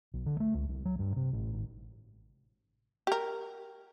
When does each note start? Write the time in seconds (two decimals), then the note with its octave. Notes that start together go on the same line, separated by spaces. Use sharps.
0.14 B1
0.26 D3
0.40 A3
0.54 C#2
0.69 C2
0.85 F#3
0.99 G2
1.16 C3
1.33 A1
1.53 G#1
3.07 G4 A#4